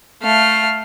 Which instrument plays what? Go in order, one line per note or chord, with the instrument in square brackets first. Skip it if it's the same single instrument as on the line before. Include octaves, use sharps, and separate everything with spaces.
[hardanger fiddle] A3 F5